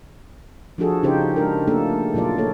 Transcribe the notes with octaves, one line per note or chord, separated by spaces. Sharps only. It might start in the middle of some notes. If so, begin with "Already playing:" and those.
F3 D4 F#4 G#4 A4
C#3 C#4 D#4 F4 G4 C5
G#3 D4 A#4
A3 A#3 D4 A4
A#2 F#3 F4 D5
A#3 A4 C#5